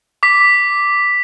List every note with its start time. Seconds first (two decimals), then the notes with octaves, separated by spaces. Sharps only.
0.23 D6 B6